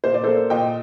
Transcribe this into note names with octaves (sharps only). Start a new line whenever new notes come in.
A#2 C5
D5
A#3 A4 C5
A#2 D#5 G5